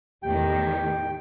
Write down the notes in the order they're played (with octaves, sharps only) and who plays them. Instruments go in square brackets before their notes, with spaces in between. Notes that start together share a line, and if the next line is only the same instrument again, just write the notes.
[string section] E2 A2 D#3 [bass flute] G4 [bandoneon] G5